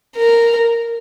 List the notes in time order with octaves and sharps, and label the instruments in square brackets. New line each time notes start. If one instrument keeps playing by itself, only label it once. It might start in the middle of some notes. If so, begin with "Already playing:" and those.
[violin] A#4